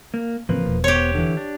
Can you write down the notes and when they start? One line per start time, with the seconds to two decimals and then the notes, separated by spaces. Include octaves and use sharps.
0.14 A#3
0.49 A1 C#3 F3 A#3 C4 B4
0.66 E1 B2
0.84 B3 G4 C5 C#5
1.14 D3 E3
1.37 D4